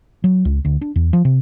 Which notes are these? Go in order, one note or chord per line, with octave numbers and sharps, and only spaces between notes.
F#3
C#2
D2
D4
E2
F3
C3